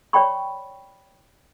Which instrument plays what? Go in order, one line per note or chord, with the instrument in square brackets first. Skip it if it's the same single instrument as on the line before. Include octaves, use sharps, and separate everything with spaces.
[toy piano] C#5 D5 G5 B5 C#6